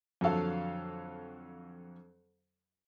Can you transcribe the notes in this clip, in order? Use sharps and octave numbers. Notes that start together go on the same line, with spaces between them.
F2 D3 F#3 A4 F5